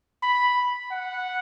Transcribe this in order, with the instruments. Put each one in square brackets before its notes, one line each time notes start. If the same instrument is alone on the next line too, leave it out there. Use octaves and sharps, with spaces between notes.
[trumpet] B5
F#5